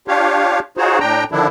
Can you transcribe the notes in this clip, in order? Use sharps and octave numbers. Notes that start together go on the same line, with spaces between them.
D4 F4 G4 C#5 F5
D#4 F4 F#4 G#4 C5 C#5
A2 D4 G5 A#5
D3 D#3 F3 D4 E4